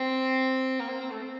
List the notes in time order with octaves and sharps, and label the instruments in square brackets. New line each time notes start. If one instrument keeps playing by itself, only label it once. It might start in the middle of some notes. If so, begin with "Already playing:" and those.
Already playing: [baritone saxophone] C4
A#3
C4
C4
A3
C4